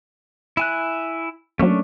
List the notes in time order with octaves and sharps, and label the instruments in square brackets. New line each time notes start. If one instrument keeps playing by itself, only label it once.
[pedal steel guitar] E4 G#5 F#6
[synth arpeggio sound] F#3 A#3 [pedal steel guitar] A3 C#4 D4